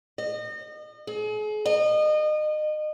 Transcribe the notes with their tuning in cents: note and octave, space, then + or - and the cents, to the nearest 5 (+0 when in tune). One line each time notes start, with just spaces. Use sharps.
D#5 -35
G#4 +40
D#5 -30